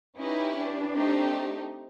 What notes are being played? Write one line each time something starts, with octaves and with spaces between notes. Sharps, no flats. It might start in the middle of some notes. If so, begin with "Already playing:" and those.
C#4 D#4 E4 G4 B4
D4
A3 C4 D#4 G4